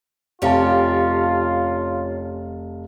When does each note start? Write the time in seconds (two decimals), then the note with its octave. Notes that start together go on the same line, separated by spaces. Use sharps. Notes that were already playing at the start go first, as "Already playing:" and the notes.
0.42 F1 C#4 F4 G4 F5 A5